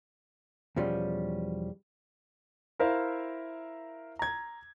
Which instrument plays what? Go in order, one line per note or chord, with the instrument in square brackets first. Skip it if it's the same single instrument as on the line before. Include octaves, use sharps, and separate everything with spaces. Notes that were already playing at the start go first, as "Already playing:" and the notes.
[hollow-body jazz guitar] E2 B2 F3 G3 C#4
[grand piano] E4 A#4 C5 E5 F5
A#5 G#6